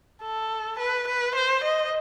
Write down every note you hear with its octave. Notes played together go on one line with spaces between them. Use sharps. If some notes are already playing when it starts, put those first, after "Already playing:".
A4
B4
B4
C5
D#5